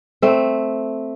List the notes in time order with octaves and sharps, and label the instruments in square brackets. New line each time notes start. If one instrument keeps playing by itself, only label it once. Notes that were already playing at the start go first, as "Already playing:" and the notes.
[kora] A3 C4